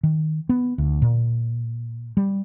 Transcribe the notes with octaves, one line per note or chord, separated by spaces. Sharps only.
D#3
B3
D2
A#2
G3